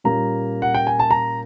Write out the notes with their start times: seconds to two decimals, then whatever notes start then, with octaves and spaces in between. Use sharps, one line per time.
0.04 A#2 G3 A#3 C#4 A#5
0.62 F#5
0.74 G5
0.87 G#5
0.99 A5
1.11 A#5